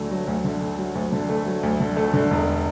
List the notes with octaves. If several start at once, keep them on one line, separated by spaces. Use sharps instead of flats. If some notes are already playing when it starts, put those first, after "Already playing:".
Already playing: D2 D3 F#3 A3
F#3
D2
D3
A3
F#3
D2
D3
A3
F#3
D2
D3
A3
D3
E1